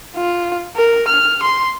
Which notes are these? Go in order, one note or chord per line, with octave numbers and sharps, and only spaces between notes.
F4
A#4
F6
C6